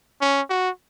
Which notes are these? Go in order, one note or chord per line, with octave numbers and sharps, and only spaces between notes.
C#4
F#4